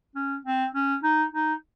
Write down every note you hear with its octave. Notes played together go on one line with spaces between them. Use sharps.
C#4
C4
C#4
D#4
D#4